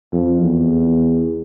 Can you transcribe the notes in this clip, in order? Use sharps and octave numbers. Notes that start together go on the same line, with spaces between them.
F2
E2